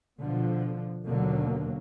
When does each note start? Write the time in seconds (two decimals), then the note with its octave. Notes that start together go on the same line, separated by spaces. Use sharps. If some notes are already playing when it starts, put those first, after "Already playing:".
0.18 B2 D3 F3
1.06 D#2 B2 D3 F#3 A#3